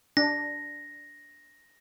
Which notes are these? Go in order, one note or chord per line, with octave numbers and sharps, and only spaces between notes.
D4 A#6